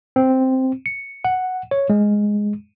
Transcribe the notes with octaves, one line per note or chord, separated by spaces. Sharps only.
C4
C#7
F#5
C#5
G#3